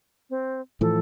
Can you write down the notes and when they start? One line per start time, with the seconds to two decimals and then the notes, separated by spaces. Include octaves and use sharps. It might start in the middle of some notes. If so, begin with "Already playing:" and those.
0.30 C4
0.81 A2 E3 F3 A4